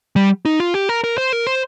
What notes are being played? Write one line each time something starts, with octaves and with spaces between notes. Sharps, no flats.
G3
D#4
F4
G4
A#4
A#4
C5
A#4
C5